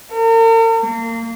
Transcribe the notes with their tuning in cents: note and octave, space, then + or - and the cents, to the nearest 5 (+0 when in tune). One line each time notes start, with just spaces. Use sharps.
A#4 -45
A#3 -25